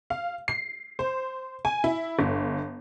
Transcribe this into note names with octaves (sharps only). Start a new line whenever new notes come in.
F5
C7
C5
G#5
E4
G1